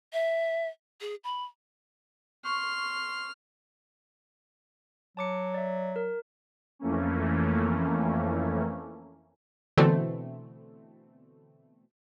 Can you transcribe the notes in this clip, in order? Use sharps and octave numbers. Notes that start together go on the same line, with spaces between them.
E5
G#4
B5
C6 C#6 F6
F#3 A5 D6 C#7
D5 E5
A#4
F2 E3 A3 A#3 C#4
B2 D3 E3 A3 C4